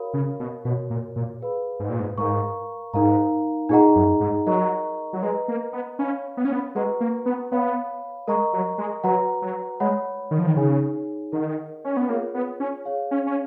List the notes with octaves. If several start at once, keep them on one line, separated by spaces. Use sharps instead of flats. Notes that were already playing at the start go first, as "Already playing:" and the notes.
Already playing: F#4 A#4 C#5 F5 B5
C#3
B2
B2 F#4 A#4 C#5
A#2
A#2
G#4 B4 F5 B5
G#2
A#2
G#2
G#2 A#4 F5 A#5 C#6
G#2 D#4 A#4 F5 A#5
A#2 D#4 G#4 D#5 F#5 A#5
F#2
G#2
F#3 A#4 D#5 A#5 C#6
F#3
G#3 B4 D#5 A#5
A#3
B3
C#4 C#5 F5 B5
B3
C#4
B3
G#3 F#4 B4 F#5 A#5 C#6
A#3
B3
B3 C#5 F5 B5
G#3 A#4 D#5 A#5 C#6
F#3
G#3
F#3 F#4 B4 F#5 A#5
F#3
G#3 C#5 F#5 B5
D#3
F3
D#3
C#3 D#4 G#4 C#5 G#5
D#3 A#4 D#5 F#5
C#4
B3
A#3 F4 G#4 C#5 F#5
B3
C#4
G#4 C#5 F5
C#4
C#4